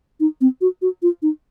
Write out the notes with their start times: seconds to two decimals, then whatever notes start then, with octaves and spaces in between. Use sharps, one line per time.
0.20 D#4
0.41 C4
0.61 F#4
0.82 F#4
1.02 F4
1.22 D#4